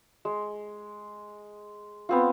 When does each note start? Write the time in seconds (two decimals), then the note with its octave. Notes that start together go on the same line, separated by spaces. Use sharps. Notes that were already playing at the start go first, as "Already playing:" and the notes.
0.25 G#3
2.09 B3 C4 F4